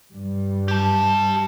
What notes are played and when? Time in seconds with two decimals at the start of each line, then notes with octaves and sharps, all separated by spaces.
0.14 G2 G3
0.68 G4 A5